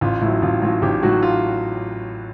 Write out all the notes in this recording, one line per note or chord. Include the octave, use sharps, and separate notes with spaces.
A1 F4
A2 F#3 E4
A1 F4
A2 F#3 F4
A1 G4
A2 F#3 F#4
F4